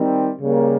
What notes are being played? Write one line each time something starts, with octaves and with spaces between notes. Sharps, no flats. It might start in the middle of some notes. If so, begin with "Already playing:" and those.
Already playing: D#3 G3 C4
C#3 G3 A#3